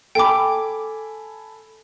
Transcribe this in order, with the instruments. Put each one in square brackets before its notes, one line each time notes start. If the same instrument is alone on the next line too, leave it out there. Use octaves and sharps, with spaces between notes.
[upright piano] A4 G#5 B5 [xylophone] G5 D6